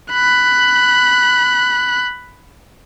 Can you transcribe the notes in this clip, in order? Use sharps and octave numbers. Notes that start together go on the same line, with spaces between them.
B5 F#6